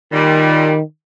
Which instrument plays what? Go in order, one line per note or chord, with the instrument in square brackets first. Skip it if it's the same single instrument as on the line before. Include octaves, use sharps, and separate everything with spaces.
[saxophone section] A#2 G3 [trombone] D#3